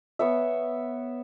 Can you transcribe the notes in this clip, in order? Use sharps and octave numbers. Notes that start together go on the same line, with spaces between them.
B3 C#5 E5